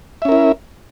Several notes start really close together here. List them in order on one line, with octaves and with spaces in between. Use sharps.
E5 C#4 A#4 E4